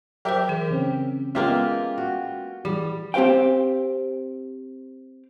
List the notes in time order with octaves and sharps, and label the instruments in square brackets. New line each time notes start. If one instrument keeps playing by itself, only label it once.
[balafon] F#3 C5 [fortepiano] G4 A#4 E5
[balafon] E3 G#4
[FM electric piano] C#3 C4 C#4
[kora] G#3 A#3 E5 [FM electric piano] B3 C#4 [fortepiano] F4 G4 A#4
[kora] F#4
[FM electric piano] E3 [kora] G3 [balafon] G#4
[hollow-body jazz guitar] C4 G4 C5 F5 G5